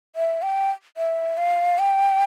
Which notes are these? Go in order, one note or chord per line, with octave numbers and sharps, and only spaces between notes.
E5
G5
E5
F5
G5